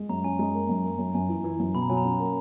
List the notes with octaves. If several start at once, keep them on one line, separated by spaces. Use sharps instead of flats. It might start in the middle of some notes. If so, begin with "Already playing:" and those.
Already playing: G#3
F#2 A#5
C#4 G#5
G#3 A#5
A#3
F#2
A#3
F#2
F#2 G#5
E3
E3
F#2
B2 B5
A#5
F#3 G#5
A#5
C#4
A#3